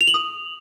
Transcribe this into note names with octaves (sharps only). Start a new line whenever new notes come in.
F7
F#7
D#6